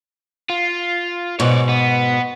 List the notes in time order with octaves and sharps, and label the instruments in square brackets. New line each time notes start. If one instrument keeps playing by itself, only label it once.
[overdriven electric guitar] F4
[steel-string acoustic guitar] G#2 B2 [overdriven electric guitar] C#5 D5
[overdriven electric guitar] B3